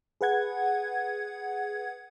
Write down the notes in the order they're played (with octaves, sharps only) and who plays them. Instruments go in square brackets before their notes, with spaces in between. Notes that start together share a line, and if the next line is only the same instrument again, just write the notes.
[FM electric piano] G#4 B4 F#5 G#6